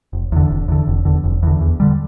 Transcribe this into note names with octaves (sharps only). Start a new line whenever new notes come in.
F1
E2 D3
F1
E2 D3
F1
E2 D3
F1
E2 D3
E2
D3 G3